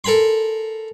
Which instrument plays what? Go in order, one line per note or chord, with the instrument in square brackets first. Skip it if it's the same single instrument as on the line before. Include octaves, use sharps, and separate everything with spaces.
[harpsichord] A4 A#4 G#5 B5 C6